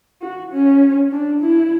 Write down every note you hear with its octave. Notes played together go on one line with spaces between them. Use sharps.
F#4
C#4
D4
E4